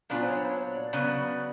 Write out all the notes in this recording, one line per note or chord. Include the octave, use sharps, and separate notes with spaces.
A#2 F#3 B3 D4 F4 D5
C5
C#5
C5
C#5
D5
C#3 F#3 B3 D5